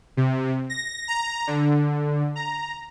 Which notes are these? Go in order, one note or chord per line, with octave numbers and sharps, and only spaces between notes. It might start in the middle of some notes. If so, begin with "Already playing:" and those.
C3
A#6
A#5
D3
A#5